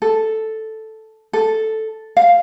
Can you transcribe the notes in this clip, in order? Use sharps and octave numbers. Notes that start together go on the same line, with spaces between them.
A4
A4
F5